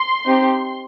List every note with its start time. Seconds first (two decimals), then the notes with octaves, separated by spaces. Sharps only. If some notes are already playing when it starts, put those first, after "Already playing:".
Already playing: C6
0.26 C4 D#4 G4